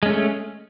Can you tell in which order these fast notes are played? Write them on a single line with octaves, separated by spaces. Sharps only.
G#3 C#4 A3